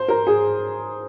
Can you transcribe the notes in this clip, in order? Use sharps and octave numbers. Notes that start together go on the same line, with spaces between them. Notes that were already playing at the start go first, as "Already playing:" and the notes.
Already playing: C5
A#4
G#4